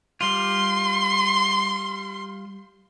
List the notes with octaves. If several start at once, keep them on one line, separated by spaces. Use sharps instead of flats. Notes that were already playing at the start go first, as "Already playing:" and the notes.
G3 F4 C6